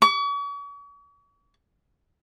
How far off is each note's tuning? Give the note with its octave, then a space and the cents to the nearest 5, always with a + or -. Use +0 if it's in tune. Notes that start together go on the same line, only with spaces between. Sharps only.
C#6 +45